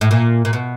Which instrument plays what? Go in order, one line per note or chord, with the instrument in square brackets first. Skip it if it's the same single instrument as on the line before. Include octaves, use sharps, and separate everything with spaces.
[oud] A2
A#2
A#2
B2